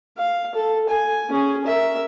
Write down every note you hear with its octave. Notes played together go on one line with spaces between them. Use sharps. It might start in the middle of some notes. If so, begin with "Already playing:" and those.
F5
A4
G#5
C#4 G#4
A#4 E5